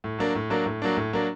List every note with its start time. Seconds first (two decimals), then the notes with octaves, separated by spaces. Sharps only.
0.04 A2
0.19 F#3 A#3 D4
0.35 A2
0.50 F#3 A#3 D4
0.66 A2
0.82 F#3 A#3 D4
0.97 A2
1.13 F#3 A#3 D4